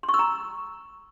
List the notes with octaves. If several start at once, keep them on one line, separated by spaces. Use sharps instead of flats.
C6
C#6
E6
A#5